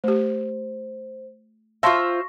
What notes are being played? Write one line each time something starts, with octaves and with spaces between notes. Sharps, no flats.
A3 G4 C5
F4 C5 E5 F5 A5 C6 C#6 A#6